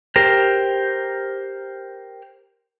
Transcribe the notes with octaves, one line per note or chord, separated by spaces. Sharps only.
G4 A#4 C5